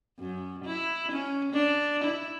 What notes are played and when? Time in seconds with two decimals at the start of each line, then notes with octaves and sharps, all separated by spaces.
0.19 F#2
0.65 E4
1.11 C#4
1.52 D4
2.04 E4